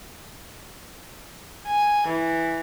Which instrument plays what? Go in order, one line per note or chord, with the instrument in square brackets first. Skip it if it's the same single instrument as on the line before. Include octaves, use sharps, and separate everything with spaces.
[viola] G#5
E3